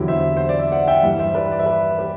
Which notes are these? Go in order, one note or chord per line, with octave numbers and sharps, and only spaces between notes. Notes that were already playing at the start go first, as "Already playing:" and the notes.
Already playing: E2 D3 F#3 E4 G4
C5 E5
C5
D5
E5
D5 F#5
E5 G5
G2 E3 G3
C5 E5
B4 D5
D5
E5
B4 D5
G4 B4